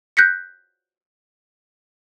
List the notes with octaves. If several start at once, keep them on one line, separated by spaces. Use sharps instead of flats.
F#6 G6 A#6 B6 C#7